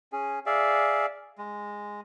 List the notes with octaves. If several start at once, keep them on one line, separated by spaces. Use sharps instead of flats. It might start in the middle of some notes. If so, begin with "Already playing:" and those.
C#4 G#4
G#4 D5 E5 F5
G#3